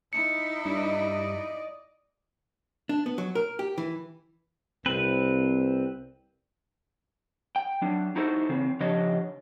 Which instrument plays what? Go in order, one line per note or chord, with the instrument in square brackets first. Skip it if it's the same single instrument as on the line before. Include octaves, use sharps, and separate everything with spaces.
[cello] D#4 E4 [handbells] C#7
[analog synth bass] G2 [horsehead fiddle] D5 D#5
[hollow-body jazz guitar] D4
B3
F#3
A#4
G4
E3
[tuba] C2 [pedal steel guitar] C4 B4
[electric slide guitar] G5
F#3 D4
D#4 E4 F#4 A4 C5
C#3 E3 C4
C#3 F3 D4 G4 C#5 D#5